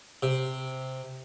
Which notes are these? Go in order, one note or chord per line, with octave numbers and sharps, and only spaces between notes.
C3